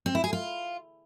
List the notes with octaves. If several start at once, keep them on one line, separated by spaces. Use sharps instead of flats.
C4
E4
G#4
F4